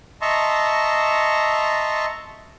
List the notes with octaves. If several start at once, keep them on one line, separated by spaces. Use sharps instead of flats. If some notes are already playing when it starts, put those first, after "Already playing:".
D#5 E5 A5 A#5 C6 C#6